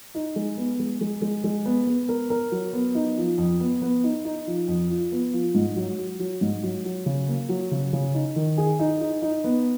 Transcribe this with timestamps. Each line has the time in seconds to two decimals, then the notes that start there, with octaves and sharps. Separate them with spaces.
0.15 D#4
0.36 G#3
0.57 B3
0.79 G#3
1.01 G#3
1.22 G#3
1.44 G#3
1.65 B3
1.87 B3
2.09 A#4
2.30 A#4
2.51 F#3
2.73 B3
2.95 D#4
3.18 F3
3.38 F2
3.61 B3
3.82 B3
4.04 D#4
4.25 D#4
4.47 F3
4.68 F2
4.90 F3
5.12 B3
5.33 F3
5.54 G#2
5.76 F#3
5.98 F#4
6.19 F#3
6.41 G#2
6.63 F#3
6.85 F#3
7.06 C#3
7.28 A#3
7.49 F#3
7.71 C#3
7.93 C#3
8.14 D#4
8.36 D#3
8.58 G#4
8.79 D#4
9.01 D#4
9.22 D#4
9.44 B3